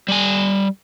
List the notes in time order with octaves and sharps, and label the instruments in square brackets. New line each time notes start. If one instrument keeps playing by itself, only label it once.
[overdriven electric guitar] G3 G#5